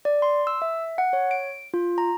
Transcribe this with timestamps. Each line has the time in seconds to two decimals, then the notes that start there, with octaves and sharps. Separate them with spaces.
0.05 D5
0.22 C6
0.47 E6
0.62 E5
0.98 F#5
1.13 C#5
1.31 D7
1.74 F4
1.98 A#5